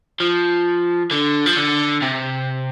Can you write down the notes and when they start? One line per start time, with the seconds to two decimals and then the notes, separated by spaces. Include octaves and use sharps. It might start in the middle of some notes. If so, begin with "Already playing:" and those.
0.20 F3
1.11 D3
1.46 F3
1.56 D3
2.02 C3